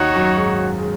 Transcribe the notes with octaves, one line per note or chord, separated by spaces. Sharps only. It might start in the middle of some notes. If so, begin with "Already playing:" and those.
Already playing: D#2 D#3 D#4 F#4 C#5
F#2 F#3
G#2 G#3
G#3